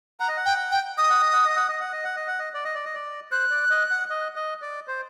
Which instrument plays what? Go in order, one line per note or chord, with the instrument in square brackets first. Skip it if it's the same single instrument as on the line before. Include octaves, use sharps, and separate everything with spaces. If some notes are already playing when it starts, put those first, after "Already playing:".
[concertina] F#5 [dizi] A#5
[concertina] D#5
F#5
[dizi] G5
G5
[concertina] D#5 [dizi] D#6
[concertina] F#5
D#5
F#5
D#5
F#5
D#5
F#5
D#5
F#5
D#5
F#5
D#5
D5
D#5
D5
D#5
D5
[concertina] C5 [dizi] F#6
[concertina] D5
D#5
F#5
D#5
D#5
D5
C5